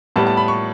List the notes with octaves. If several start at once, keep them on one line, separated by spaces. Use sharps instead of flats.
A2 G3 B3 A5
A5
B5
C#6